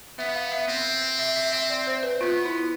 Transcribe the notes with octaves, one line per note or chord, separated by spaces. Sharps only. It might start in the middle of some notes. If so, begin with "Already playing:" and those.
B3 E5
F5
E5
C4
E5
E5
E5
D5
C5
B4
B3 F4
E4